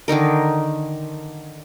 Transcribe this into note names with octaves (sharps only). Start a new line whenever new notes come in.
D3 D#3 D#4 A#4